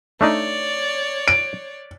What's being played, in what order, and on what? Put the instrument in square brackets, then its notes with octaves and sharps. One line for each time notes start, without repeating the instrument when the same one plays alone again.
[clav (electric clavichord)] A3 D4 D#4 [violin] C#5 D5
[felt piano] D7